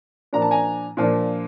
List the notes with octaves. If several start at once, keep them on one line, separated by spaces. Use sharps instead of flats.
A#2 F3 A#3 D4 A#5
A5
G#5 A#5
A#2 F3 A#3 D4